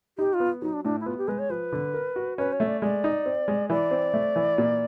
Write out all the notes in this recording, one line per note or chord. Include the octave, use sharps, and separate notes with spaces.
D#4 G4
F4
B3
F#3 D#4
D4
A2 D4
E4
B3 F4
G4
G#3 B4
C#5
F3 B4
D3
A#4
F#4
C#4 B4
C#5
A3
D5
G#3 D5
D#4
C4
G#3
E3 D5
C4
A3
E3
A#2